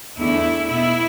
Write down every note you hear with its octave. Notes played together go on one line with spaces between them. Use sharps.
E2 D3 A3 E4
B2 B3 E4